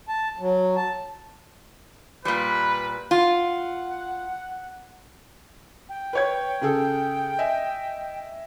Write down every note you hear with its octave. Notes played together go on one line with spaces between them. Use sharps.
A5
F#3
A5
A#2 G3 B4
F4 F#5
G5
B4 C#5 G#6
C#3 G#4 A4
D#5 E5 G#5